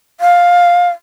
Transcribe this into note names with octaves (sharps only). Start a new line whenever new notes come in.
F5